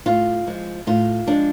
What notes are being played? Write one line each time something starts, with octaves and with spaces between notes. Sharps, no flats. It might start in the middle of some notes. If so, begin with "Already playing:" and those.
A2 F4
F3 G#3
A2 F4
F3 G#3 D4